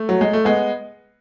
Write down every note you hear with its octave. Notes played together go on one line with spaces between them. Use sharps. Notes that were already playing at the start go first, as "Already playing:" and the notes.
Already playing: A3
F#3
G#3
A3
G#3 B3